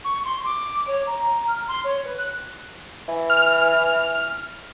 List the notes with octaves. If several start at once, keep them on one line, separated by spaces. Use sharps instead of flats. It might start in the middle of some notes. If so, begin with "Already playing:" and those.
C#6
C6
D6
C#5
A#5
F6
C6
C#5
B4
F#6
E3
F6